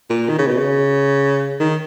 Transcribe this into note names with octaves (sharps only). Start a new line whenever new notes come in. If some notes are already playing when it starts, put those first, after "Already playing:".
A#2
D#3
C#3
B2
C#3
D#3